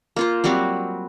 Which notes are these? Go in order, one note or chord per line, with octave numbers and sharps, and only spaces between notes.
A#3 F4 C5
F#3 G3 C4 F#4